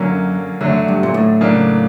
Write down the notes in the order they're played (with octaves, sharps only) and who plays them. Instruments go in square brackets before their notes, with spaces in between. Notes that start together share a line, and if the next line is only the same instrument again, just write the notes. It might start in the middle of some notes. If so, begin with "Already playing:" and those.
Already playing: [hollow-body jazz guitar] F#2 [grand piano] D3 F#3 A#3 C#4
[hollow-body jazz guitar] F#2 [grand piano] D3 F#3 A3
[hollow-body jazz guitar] G2
A#2
A2
[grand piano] C#3 F#3 A#3 D4